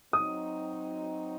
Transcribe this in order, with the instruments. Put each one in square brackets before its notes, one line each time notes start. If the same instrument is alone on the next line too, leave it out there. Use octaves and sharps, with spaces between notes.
[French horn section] F#3 C4 D#4 [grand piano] D#6